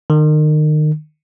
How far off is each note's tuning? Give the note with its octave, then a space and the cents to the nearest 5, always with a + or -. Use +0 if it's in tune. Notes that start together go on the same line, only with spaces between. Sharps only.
D#3 -30